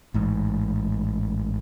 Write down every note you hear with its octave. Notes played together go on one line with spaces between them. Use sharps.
A1 G#2